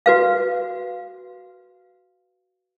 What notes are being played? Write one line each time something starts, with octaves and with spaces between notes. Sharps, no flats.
F#4 B4 F5